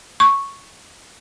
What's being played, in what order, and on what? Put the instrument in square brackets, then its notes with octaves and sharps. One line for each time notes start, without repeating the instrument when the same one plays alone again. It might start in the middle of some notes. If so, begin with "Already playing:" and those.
[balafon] C#6